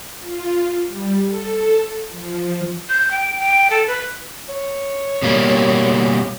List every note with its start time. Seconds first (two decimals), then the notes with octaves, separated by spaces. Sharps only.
0.20 F4
0.87 G3
1.25 A4
2.08 F3
2.89 G6
3.11 G5
3.39 G5
3.70 A4
3.87 B4
4.49 C#5
5.22 B2 G3 A#3